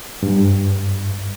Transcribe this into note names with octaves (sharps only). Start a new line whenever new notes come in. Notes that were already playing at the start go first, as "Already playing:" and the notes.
G2